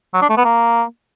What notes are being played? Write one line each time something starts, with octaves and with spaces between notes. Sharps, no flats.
F#3
D4
A3
B3
A#3